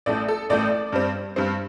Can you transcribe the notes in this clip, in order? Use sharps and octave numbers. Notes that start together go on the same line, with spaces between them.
A1 A2 A3 D5
A4
A1 A2 A3 D5
G2 G3 C4
G2 G3 C4